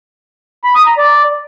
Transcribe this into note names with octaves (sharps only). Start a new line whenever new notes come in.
B5
D#6
A#5
D5